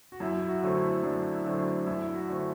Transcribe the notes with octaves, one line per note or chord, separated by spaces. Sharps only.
F#4
F#2 E4
E4
F#4
D3 F#3 A3 C4
E4
F#2 D4
E4
D3 F#3 A3 C4
D4
F#2 E4
E4
F#4
D3 A3 C4